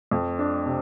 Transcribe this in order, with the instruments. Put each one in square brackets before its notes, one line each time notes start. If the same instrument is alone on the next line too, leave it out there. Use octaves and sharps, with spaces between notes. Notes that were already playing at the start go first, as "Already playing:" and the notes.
[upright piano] F2
D4
C3